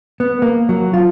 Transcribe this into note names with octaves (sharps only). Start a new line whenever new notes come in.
B3
A#3
F#3
F4